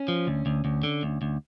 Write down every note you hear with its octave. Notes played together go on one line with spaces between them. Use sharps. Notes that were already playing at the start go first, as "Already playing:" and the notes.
Already playing: C#4
F3
D2
D2
D2
D3
D2
D2